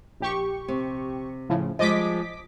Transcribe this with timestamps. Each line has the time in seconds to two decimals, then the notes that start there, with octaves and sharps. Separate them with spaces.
0.20 A#1 G4 C#6
0.68 C3
1.49 A2 C#3 F3
1.79 F3 G3 G#3 D#5 D6 B6